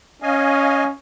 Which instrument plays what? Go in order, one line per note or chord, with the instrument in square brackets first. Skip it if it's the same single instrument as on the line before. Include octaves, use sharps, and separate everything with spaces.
[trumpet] C#4 [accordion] D#5 F5 G#5